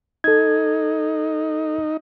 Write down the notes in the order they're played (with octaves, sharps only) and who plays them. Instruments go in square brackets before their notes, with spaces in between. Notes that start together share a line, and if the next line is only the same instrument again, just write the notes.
[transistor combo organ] D#4 [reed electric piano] A4 G#6